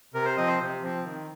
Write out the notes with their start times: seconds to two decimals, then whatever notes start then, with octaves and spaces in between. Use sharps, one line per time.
0.14 C3 A#4
0.25 C5
0.37 F3 C4 D#5
0.48 C5
0.60 C3
0.82 F3 C4
1.04 D#3